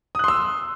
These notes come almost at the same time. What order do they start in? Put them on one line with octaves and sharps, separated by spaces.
D#6 F#6 C6 E6